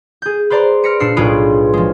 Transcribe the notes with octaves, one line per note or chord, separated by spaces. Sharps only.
G#4 G6
B4 C5 D5 A#5 C6
F6 A#6 B6 C#7 D7
A#2 D4 E6 C7 C#7
B1 A2 F4 G#4 B4 D7
F3 G#3